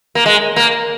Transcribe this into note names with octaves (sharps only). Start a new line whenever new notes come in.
A#3
G#3
A#3